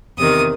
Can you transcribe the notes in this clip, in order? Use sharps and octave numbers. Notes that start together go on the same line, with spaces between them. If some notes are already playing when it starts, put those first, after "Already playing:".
E2 C3 D#3 D#6